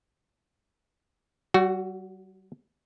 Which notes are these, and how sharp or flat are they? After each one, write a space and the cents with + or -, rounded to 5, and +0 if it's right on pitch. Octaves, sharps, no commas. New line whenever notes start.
G3 -45 F#4 +0